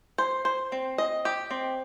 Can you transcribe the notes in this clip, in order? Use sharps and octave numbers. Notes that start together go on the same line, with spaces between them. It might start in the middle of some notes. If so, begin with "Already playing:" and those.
C5
C5
C4
D#5
G4
C4